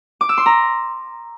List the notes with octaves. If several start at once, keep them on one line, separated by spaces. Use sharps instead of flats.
D6
E6
C6
A#5